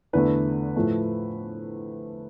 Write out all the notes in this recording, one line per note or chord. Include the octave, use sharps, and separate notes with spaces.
E2 D3 A3 B4
A2 F3 A3